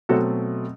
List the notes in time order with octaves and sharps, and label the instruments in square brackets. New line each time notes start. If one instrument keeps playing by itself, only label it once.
[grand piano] B2 F#3 A3 C4 F#4 A4